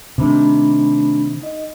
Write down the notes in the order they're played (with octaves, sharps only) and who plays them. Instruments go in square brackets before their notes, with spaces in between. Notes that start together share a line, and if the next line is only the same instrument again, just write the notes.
[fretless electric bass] C3 D#3 [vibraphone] A3 D4 B5
[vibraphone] D#4 D#5